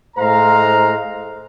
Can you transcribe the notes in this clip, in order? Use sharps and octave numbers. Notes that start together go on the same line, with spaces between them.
A2 G#3 C5 F5 A#5